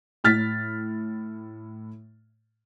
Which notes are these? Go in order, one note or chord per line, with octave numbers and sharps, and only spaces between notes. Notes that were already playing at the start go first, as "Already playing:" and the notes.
A2 F6 A6 B6